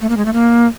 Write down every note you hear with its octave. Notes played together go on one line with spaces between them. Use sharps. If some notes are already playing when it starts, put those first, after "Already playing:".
A3
A#3
G#3
A3
A#3